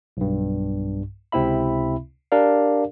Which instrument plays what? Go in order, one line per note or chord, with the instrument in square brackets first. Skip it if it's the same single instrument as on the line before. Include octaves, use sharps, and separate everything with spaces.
[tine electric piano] B1 G2
C#2 C3 C4 E4 E5 B5
D4 G4 A#4 D5 F5